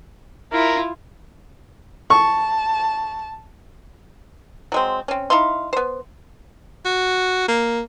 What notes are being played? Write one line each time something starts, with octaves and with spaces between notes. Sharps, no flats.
E4 F4 A#4
A5 C#6
F#3 G#3 C4
C4 C#4
D#4 E4 F5 C6
B3 C5
F#4
A#3